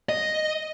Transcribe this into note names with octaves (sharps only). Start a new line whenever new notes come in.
D#5